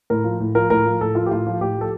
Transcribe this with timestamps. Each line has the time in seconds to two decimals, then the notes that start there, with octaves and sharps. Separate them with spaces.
0.10 A2 A#4
0.24 F3
0.40 A2
0.55 F3 A#4
0.70 A2 A#4
0.86 F3
1.01 A2 A4
1.15 F3 F4
1.26 G4
1.31 A2 F4
1.47 F3
1.61 A2 G4
1.77 F3 A4